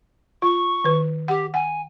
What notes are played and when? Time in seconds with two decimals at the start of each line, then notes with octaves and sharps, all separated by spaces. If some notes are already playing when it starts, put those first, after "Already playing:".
0.42 F4 C#6
0.84 D#3 B4
1.28 G4 F#5
1.54 F#5 G#5